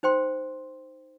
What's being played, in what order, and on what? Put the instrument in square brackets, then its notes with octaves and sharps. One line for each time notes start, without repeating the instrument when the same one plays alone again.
[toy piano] D#4 C5 G5 C6